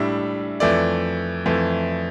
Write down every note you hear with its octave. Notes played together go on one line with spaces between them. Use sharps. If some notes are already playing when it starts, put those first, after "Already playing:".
Already playing: A2 G3 D4 E5
F2 E3 A3 D5
F2 E3 A3